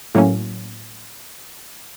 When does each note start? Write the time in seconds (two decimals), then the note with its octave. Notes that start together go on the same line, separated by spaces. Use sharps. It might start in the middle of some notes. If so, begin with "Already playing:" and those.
0.15 A2 F#3 A#3 C#4